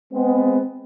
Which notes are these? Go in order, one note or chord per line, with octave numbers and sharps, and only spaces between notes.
G#3 B3 C4